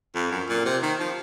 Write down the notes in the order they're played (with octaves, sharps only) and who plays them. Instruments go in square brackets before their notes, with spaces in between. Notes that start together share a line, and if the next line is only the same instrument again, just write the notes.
[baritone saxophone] F2
F#2
A#2
C3
D#3
F3